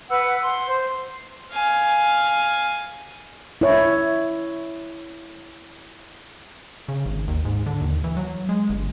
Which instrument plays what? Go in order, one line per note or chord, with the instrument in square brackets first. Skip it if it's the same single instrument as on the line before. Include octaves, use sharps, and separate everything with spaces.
[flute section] B4 F#5 E6
C6
C5
[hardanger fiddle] F5 G#5
[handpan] E4 C#5
[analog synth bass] C#3
G#1
D#2
G#2
D3
D#2
E3
F#3
G#3
G1